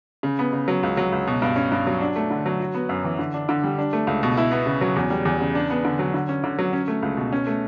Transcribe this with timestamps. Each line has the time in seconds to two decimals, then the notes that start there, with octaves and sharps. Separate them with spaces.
0.23 C#3
0.39 B3
0.53 C#3
0.68 F#3
0.83 C#2
0.97 F#3
1.12 C#2
1.27 B2
1.42 G2
1.56 C#4
1.72 G2
1.87 F#3
2.01 D4
2.16 A3
2.31 D3
2.46 F#3
2.60 F#4
2.74 B3
2.89 F#2
3.04 E3
3.19 D3
3.34 D4
3.49 D3
3.64 G3
3.78 D4
3.93 A3
4.07 C#2
4.23 B2
4.37 E4
4.52 B3
4.66 C#3
4.81 F#3
4.96 E2
5.10 G3
5.25 E2
5.41 C#3
5.55 D4
5.70 B3
5.85 D3
5.99 F#3
6.14 D3
6.29 C#4
6.44 D3
6.59 F#3
6.73 C#4
6.88 A3
7.02 C#2
7.17 B2
7.32 C#4
7.47 A3